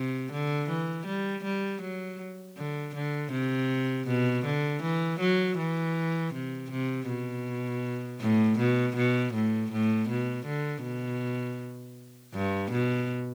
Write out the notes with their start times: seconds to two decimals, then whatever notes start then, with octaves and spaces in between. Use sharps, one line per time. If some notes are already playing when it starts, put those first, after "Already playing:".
Already playing: C3
0.32 D3
0.69 E3
1.06 G3
1.43 G3
1.81 F#3
2.57 D3
2.95 D3
3.32 C3
4.07 B2
4.45 D3
4.82 E3
5.19 F#3
5.57 E3
6.33 C3
6.70 C3
7.08 B2
8.20 A2
8.59 B2
8.96 B2
9.34 A2
9.72 A2
10.09 B2
10.46 D3
10.84 B2
12.34 G2
12.72 B2